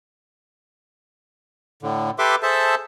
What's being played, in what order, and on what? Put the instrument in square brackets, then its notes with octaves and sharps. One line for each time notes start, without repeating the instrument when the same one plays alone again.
[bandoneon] A2 D3
G4 A4 B4 E5 C6 D6
G#4 A4 C5 E5 A5